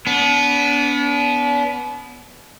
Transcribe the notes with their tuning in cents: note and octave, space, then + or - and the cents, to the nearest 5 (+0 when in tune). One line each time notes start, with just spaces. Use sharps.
B3 +0 D4 -40